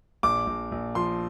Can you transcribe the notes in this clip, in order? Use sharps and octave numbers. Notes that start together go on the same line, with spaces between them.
A#1 D6
A#1
A#1
F3 C6